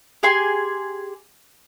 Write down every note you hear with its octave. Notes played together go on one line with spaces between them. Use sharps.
G4 G#4 G#5 C6